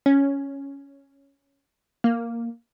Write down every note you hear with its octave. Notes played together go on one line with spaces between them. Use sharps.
C#4
A#3